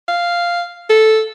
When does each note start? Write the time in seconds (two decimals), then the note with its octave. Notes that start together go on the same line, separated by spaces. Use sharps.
0.08 F5
0.90 A4